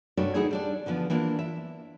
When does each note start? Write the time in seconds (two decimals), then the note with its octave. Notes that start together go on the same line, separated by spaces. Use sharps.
0.17 G2 C3 A3 C#4 F#4 D5
0.34 E2 D#4 E4 G#4 A4 F#5
0.51 G3 D4 D5
0.86 D3 E3 F3 B3
1.10 E3 A#3 D4 E4 F4
1.39 E5